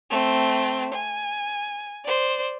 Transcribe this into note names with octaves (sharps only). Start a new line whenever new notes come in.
A3 C4
G#5
C5 D5